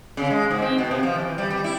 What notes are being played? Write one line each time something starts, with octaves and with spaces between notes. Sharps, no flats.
C#3
G#3
G#2
C4
B2
C3
F3
E3
G3
G3
E4